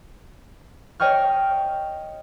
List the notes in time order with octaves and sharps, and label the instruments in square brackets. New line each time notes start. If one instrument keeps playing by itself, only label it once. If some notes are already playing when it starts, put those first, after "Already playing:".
[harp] C#5 D#5 G5 C#6 F6